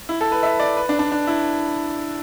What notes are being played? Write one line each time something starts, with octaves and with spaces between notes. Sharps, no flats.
E4
A4
B4
E5
D5
B4
D4
D4
D4
E4